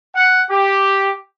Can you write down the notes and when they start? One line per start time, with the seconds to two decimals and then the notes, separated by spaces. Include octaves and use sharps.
0.14 F#5
0.49 G4